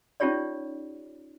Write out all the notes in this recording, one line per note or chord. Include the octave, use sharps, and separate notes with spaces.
C#4 D#4 F4 G4 C#5 D5